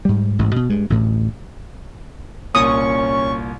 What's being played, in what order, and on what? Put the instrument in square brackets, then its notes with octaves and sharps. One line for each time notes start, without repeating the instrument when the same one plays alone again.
[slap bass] G#2 G3
A1 G#2
B2
G2 G#3
A1 D2 A2
[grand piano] C2 A#2 [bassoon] C#4 [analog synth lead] C#6 [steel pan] D#6